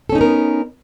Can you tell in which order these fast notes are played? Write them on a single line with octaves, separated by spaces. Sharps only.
A4 C#4 D#4 B3 A#4